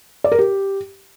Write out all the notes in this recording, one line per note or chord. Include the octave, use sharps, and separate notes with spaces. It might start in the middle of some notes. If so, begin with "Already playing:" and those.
D5
A#4
G4